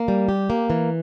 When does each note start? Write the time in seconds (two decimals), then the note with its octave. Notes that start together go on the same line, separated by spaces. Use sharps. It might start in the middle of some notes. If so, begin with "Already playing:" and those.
Already playing: A#3
0.08 G3
0.28 G4
0.50 A#3
0.70 E3